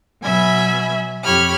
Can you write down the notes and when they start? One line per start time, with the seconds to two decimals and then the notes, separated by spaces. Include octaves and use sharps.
0.22 B2 F#3 E5 G#5 B5
1.23 F2 G4 C#5 B5 F6